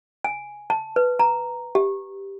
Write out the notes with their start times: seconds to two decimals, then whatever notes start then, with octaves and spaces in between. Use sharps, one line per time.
0.24 G#5
0.70 A5
0.96 B4
1.19 A#5
1.75 G4